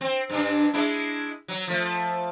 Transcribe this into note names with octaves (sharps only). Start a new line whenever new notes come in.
C4
G2 D4
G#3 D4 E4
F#3
F3 A3